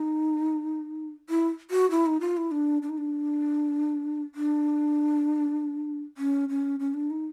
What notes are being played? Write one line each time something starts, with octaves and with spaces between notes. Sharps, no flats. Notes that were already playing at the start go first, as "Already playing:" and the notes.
Already playing: D#4
E4
F#4
E4
D#4
F4
E4
D4
D4
D#4
D4
D4
C#4
C#4
C#4
D4
D#4